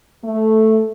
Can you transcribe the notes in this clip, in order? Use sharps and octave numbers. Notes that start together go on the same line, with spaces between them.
A3